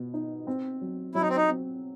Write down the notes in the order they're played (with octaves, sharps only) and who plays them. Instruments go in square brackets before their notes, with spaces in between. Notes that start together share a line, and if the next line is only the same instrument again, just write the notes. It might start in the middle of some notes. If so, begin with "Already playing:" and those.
Already playing: [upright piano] B2
D#4
C4
F#3
[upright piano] F#3 [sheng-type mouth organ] E4
[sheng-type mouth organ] D#4
C4
D#4
[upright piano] C4